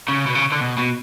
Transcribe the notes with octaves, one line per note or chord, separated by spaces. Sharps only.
C#3
B2
C#3
D3
B2
B2